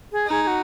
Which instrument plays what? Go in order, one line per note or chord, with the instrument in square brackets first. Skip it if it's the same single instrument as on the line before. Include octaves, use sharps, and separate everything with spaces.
[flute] G#4
[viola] D#4 [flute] G#4
[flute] G#4
F#4